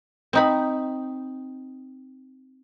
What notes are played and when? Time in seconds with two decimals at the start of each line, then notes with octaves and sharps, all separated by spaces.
0.33 C4 D#4 B5